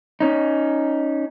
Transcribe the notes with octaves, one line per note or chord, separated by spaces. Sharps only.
C#4 D#4